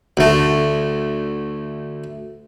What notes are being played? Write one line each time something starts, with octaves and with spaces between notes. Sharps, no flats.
D2 A3